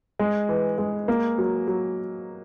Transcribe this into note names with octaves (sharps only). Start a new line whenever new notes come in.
G#3
E3
G#3
A#3
F#3
F#3